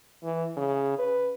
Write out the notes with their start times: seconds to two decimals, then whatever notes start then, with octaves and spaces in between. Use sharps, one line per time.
0.24 E3
0.57 C#3
0.99 B4